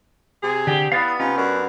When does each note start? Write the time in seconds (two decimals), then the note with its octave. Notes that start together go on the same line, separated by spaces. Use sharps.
0.43 C3 G#4
0.67 D3 G4
0.92 B3 E4 D5 F5
1.20 C3 C#4 D#4 F4
1.38 F#2 D4 A#4